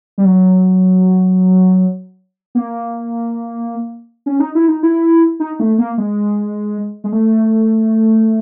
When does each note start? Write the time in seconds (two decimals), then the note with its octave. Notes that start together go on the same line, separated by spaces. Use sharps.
0.18 G3
0.25 F#3
2.55 A#3
4.26 C#4
4.40 D#4
4.55 E4
4.68 D#4
4.83 E4
5.40 D#4
5.60 A3
5.78 A#3
5.98 G#3
7.04 G#3
7.12 A3